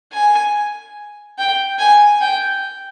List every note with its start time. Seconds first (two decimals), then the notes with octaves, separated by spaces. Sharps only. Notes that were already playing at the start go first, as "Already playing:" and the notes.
0.13 G#5
1.39 G5
1.79 G#5
2.21 G5